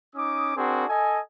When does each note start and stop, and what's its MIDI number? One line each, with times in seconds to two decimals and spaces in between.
0.16 0.54 61
0.16 0.54 63
0.16 0.54 86
0.16 0.54 87
0.56 0.84 60
0.56 0.84 62
0.56 0.84 66
0.56 0.84 68
0.56 0.84 70
0.89 1.19 69
0.89 1.19 75
0.89 1.19 80